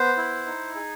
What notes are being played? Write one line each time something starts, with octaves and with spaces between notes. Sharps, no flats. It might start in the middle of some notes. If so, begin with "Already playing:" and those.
Already playing: B3 C5
E4
D#4
G#4